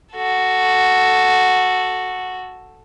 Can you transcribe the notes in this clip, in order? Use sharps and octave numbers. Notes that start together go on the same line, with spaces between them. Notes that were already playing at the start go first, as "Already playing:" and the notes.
F#4 A4